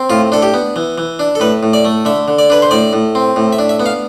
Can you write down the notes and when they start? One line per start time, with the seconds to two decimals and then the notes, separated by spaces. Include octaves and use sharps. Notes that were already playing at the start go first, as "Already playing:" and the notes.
Already playing: C4
0.10 A2 F4
0.32 D4 A4
0.42 G4
0.54 B3
0.76 E3
0.98 E3
1.19 D4
1.35 A4
1.40 A2 B4
1.63 A2
1.73 D5
1.85 A3
2.05 D3 E5
2.28 D3
2.39 D5
2.50 D4 B4
2.62 C5
2.71 A2 D5
2.93 A2
3.15 C4
3.36 A2
3.53 E5
3.59 D4
3.69 E5
3.80 B3
3.86 F5